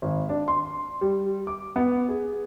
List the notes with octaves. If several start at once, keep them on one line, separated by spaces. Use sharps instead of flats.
G#1
D4
C6
G3
D6
B3
G#4